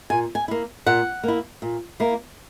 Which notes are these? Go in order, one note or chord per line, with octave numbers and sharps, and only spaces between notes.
A#2 G#5
G#5
A#3 E4
A#2 F#5
A#3 E4
A#2
A#3 E4